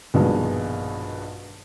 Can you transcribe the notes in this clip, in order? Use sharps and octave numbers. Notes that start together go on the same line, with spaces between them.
A#1 G2 B2 D#3 G#3